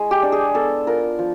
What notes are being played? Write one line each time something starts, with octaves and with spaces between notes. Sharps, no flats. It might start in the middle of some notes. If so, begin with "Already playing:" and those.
Already playing: G#3 E4
G4
D4
G#4
B3 A4
F4 A#4
F3